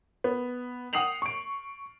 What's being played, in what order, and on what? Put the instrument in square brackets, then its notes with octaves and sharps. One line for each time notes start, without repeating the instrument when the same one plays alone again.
[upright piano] B3
F#5 G5 D#6 C7 F7 F#7
C#6 D7